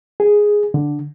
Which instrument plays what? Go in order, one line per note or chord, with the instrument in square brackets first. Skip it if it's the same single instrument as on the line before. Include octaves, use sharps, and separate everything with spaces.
[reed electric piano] G#4
D3